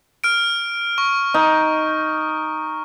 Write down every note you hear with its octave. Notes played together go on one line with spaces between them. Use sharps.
F6 D7
C#6
D#4